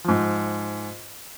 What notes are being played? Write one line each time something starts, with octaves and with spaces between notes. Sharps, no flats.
G#2 F3